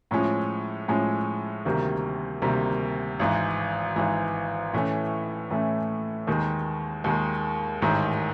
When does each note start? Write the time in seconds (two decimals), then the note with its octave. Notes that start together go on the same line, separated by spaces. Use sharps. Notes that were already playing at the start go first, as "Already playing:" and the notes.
0.11 A2 F3 G#3 C#4
0.88 A2 F3 G#3 C#4
1.65 D2 C3 D#3 G3 A#3
2.42 D2 C3 D#3 G3 A#3
3.19 G#1 G#2 E3
3.96 G#1 G#2 E3
4.73 A2 E3 A3 C#4
5.50 A2 E3 A3 C#4
6.27 D#2 D#3 G#3
7.04 D#2 D#3 G#3
7.82 A1 G#2 D#3